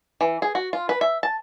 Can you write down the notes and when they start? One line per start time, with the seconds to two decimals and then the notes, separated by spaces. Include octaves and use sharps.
0.21 E3
0.42 G#4
0.55 F#4
0.73 F4
0.89 B4
1.01 E5
1.23 A5